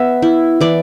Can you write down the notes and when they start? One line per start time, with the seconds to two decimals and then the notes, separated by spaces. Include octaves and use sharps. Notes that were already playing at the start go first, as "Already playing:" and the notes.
Already playing: B3 E5
0.22 E4
0.61 E3 D5